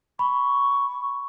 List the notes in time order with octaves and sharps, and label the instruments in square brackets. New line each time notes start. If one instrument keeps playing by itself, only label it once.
[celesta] B5 [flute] C#6